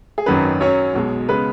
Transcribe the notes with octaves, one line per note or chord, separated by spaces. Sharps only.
G#4
G#1 F#2 D#3 F#3 C#4 B4
F#2 F#3 C#4 C#5
B1 B2 G#3
C#3 G#3 B3 B4